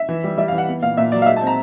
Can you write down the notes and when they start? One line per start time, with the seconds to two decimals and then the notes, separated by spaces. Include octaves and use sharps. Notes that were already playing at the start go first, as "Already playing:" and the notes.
Already playing: E5
0.09 E3
0.24 G3
0.38 G3 E5
0.48 E3 F5
0.58 F#5
0.68 B3
0.82 A#2 F5
0.97 A#2 E5
1.12 F#3 D5
1.22 F5
1.26 G#3 E5
1.36 C4 A5
1.47 A#5